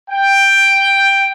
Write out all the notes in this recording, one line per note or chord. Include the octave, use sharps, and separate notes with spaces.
G5